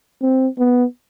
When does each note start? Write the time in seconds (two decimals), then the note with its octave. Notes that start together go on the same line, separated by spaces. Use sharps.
0.22 C4
0.59 B3